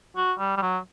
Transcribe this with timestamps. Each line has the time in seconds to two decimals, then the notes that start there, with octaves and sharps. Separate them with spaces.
0.17 F#4
0.39 G3
0.57 G3
0.62 F#3